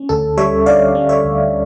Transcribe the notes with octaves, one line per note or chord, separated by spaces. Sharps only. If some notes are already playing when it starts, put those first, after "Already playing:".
Already playing: C#4
D2 A4
G3 C#5 E5
D3 D5 F5
C#4
C#5 E5
D2